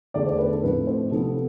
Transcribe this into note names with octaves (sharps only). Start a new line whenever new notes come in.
E2 D3 A3 D4 D5
C5
B4
A4
A2 F3 A3 C4 B4
C5
C3 F3 B3 A4